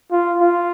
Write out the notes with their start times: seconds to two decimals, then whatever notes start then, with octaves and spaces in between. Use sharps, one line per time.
0.12 F4
0.40 F4